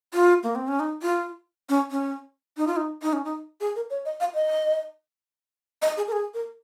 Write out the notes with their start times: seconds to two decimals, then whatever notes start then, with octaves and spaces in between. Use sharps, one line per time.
0.14 F4
0.43 A#3
0.55 C4
0.68 C#4
0.80 D#4
1.03 F4
1.69 C#4
1.91 C#4
2.57 D#4
2.67 F4
2.77 D#4
3.02 D#4
3.13 C#4
3.25 D#4
3.61 G#4
3.76 A#4
3.90 C#5
4.05 D#5
4.20 F5
4.34 D#5
5.82 D#5
5.97 G#4
6.07 A#4
6.12 G#4
6.34 A#4